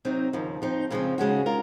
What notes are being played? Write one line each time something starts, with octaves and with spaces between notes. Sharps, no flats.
C3 F#3 C4 D#4
D#2 C#3 F3
F3 C4 D#4
F2 C#3 F3 G#3 C4
C#3 G#3 C#4 F#4
F4 A#4